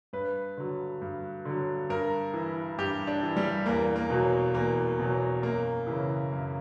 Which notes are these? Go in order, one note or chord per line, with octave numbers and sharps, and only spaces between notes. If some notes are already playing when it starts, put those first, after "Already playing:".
G2 B4
D3 F#3
G2
D3 F#3
G2 A#4
E3
G2 G4
D4
E3
G3
E2 A#3
A#3
B2 F#3
E2 A#3
B2 F#3
F#2 A#3
C#3 E3
F#2